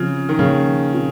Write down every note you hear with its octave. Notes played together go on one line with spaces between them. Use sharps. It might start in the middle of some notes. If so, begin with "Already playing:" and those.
Already playing: C#3 F3 C4 F4
D#3
A#2 C#3 F3 A#3 C#4
C4 F4